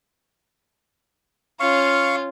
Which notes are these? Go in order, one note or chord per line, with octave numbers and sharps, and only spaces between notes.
C#4 F4 F5 C#6